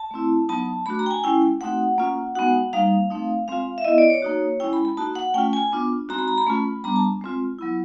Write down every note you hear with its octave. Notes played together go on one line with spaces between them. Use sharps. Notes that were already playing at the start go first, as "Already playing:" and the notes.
Already playing: A5
A3 C4 E4
F#3 B3 D#4 A5
A3 D4 F#4 B5
A#5
G5
G#5
G#3 C#4 E4 G5
G5
A3 C4 D#4 F#4 F#5
A#3 C#4 F4
G#3 B3 D#4 F#4 F#5
G3 A#3 D#4 F5
A3 C4 D#4
G#3 C4 F4 F5
E5
B3 E4 D#5
D5
C#5
A#3 D#4 F#4
G#3 C#4 E4 G5
B5
B5
A#3 D#4 F#4 A5
F#5
A3 C#4 F4 G5
G#5
B3 D4 F4
G#3 C4 D#4 F#4 A#5
B5
A#5
B5
A3 C#4 F4
G3 B3 D4 A#5
A5
G#3 C4 F4
F#3 B3 E4